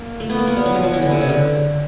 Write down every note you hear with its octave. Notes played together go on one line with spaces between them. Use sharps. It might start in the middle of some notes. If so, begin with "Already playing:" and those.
Already playing: A#3
A3
B3
A#3
B3
G3
F#3
F3
F#3
E3
D3
C3
C#3
D3